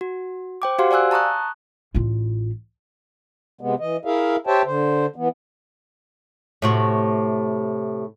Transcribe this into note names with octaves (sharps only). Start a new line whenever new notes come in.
F#4
C5 G5 D6
F#4 G4 C5 F5 F#5 C6
D5 F5 G#5 E6 F#6
A5 A#5 C#6 D#6 F#6
A1 F4
C3 G#3 B3
E3 D#5
E4 G#4 A#4 E5 F5
G4 C5 C#5 E5 G5 A5
D3 C5
E3 B3
A2 C3 F#4